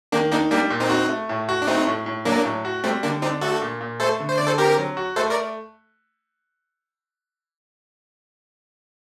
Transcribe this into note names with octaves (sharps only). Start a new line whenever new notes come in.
D#3 A#3 D4
A#3 D4 D#4
G3 A#3 D4
A#2
C4 D#4
F#4
A3
A2
F#4
D4
A3 C4 D#4
A2
A2
F#3 A#3 D4
A2
F#4
G3 A3 C4
D3 A#3 D4
C4 D4 D#4
A3 F#4 A4
A#2
A#2
A3 A4 C5
D3
C5
D3 D5
A4 C5
C4 G4 A#4
F#3
F#4
A3 A4 C5
A#4 D5